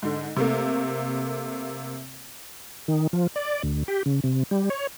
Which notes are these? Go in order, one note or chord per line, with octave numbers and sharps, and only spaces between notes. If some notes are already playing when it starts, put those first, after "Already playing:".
G#2 D3
C3 A3 A#3
D#3
F3
D5
D2
G4
C#3
C3
G3
C#5